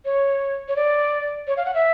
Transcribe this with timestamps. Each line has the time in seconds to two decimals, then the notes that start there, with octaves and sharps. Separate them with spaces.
0.05 C#5
0.68 C#5
0.76 D5
1.48 C#5
1.57 F5
1.65 F#5
1.74 E5